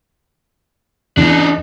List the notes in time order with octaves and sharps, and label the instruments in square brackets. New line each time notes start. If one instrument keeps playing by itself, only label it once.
[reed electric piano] E2 [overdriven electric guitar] D4 D#4